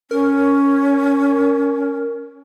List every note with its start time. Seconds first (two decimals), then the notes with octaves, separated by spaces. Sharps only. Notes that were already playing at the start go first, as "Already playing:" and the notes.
0.11 C#4 A#4